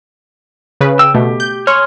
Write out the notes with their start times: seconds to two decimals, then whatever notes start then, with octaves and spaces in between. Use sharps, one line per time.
0.81 C#3 B4
0.99 G5 E6
1.14 B2 A3 G4
1.40 G6
1.67 G#4 C#5 C6 F6